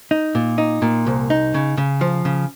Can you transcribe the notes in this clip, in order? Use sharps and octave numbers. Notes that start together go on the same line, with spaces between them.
D#4
A#2
D#4
A#2
C2
D#4
C#3
C#3
F3
C#3